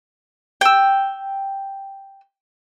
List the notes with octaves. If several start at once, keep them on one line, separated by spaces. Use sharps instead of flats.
G5 E6